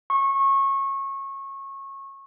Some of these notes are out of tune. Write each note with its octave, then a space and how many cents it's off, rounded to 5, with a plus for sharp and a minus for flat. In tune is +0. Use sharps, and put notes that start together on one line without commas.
C#6 -25